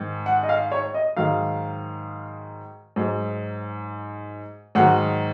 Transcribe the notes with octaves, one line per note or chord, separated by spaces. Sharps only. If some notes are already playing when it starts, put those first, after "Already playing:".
Already playing: G#2 D#3
F#5
D#5
F5
C#5
D#5
G#2 D#3 F#3 F5
G#2 F#3
G#2 D#3 F#3 F#5